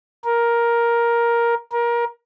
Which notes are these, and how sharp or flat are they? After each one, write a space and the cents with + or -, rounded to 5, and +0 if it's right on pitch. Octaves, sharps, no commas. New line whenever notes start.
A#4 +10
A#4 +25